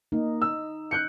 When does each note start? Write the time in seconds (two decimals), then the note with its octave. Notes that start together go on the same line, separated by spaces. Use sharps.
0.12 A#3 D#4
0.42 E6
0.91 F#6 G6 C#7